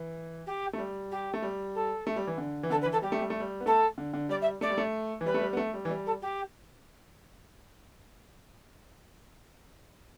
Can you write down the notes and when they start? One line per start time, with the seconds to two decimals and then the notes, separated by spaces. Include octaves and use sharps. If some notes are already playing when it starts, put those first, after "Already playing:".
Already playing: E3
0.46 G4
0.73 A3
0.78 G3
1.11 G4
1.34 A3
1.42 G3
1.74 A4
2.07 A3
2.16 G3
2.27 E3
2.38 D3
2.63 E3
2.70 D3 A4
2.81 B4
2.86 E3
2.92 A4
3.02 G3 G4
3.12 A3
3.21 G3
3.30 A3
3.40 G3
3.60 B3
3.66 A3 A4
3.98 D3
4.13 D3
4.29 G3 D5
4.41 E5
4.61 A3 D5
4.70 G3
4.78 A3
5.21 E3
5.26 G3 B4
5.34 A3
5.41 G3
5.53 B3
5.57 A3
5.74 G3
5.85 E3
5.89 G3
6.06 A4
6.21 G4